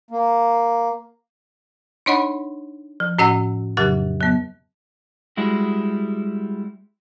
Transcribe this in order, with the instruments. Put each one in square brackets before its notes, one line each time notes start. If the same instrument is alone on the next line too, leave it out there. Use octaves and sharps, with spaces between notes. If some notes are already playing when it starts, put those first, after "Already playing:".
[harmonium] A#3
[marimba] D4 D#4 C#5 D#5 F#5 B5
F3
A2 C#4 F#4 D#5 F#5 E6
F2 C#3 F#3 G4 A6
F#3 B3
[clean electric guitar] G3 G#3 E4 F#4